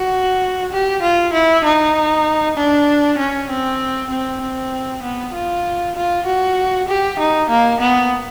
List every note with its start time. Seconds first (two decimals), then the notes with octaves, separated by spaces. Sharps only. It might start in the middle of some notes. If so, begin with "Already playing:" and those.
Already playing: F#4
0.72 G4
1.02 F4
1.33 E4
1.64 D#4
2.57 D4
3.18 C#4
3.50 C4
4.10 C4
4.41 C4
5.03 B3
5.33 F4
5.96 F4
6.26 F#4
6.88 G4
7.19 D#4
7.50 A#3
7.81 B3